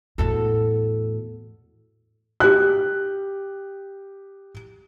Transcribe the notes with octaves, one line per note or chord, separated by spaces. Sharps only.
E2 A2 F#4 A4
G4 F#6